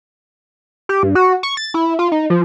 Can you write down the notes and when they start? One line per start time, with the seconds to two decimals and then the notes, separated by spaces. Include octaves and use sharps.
0.89 G4
1.03 G2
1.15 F#4
1.43 C#6
1.57 A6
1.74 E4
1.99 F4
2.12 D#4
2.30 F3